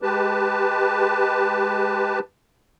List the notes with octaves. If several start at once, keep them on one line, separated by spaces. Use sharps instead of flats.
G#3 G4 B4 A5